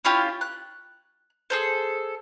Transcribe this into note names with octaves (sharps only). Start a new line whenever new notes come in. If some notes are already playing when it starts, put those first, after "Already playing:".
C#4 E4 F4 G4
F#6
G#4 A4 C5